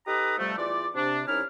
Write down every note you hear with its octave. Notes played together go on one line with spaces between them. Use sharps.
D#4 G4 A4 B4 A#5 D#6
C3 F3 G3 A3
E2 E3 F4 D5
C3 D4
C2 C#4 D#4 E4 F6